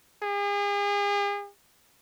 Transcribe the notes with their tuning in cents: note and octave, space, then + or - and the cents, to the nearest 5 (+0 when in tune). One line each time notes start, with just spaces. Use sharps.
G#4 -40